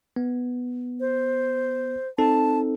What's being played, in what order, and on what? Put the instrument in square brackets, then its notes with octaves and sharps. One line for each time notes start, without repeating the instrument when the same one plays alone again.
[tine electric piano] B3
[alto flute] C5
[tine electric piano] C4 D#4 A4 [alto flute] A5